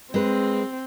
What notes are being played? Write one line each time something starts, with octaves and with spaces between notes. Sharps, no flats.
G#3 C4 B4